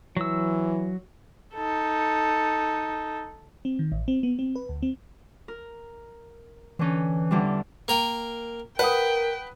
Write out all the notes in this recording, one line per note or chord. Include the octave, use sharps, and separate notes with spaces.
E3 F#3 E6
D#4 A4
C4
D#3
A1
C4
B3
C4
B4
D2
C4
A#4
D3 E3 C#4
E2 D3 G3
A#3 A#4 G5
A#4 B4 F#5 G5 D#6